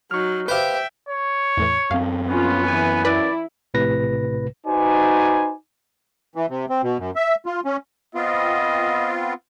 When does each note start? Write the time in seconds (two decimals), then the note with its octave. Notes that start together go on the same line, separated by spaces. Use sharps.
0.11 F#3 D#4 C#6 F6
0.48 G4 B4 C5 E5 F5 G5
1.09 C#5
1.57 E2 A2 E3
1.91 F#2 C4 F5
2.29 F3 B3 C#4 F4
2.66 E3 G#5
3.05 E4 B4 D5
3.74 A#1 A2 C3 B4 A#6
4.66 D#4 F#4 B4 C5 D5 G#5
6.35 E3
6.50 C3
6.70 C4
6.83 B2
6.99 F#2
7.16 E5
7.46 F4
7.65 C#4
8.15 B3 C4 F4 D#5